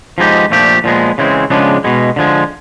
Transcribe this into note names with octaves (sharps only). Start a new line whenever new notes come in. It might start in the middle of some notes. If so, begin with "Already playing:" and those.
F3 G#3 B3 D#4 G4
A#2 F3 A3 D4 G4
A#2 F3 G#3 B3
C#3 E3 G#3 C4
C#3 F3 G#3 B3 D4
B2 G#3 B3
D3 F3 G#3